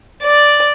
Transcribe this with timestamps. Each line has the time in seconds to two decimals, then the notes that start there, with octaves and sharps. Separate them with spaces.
0.23 D5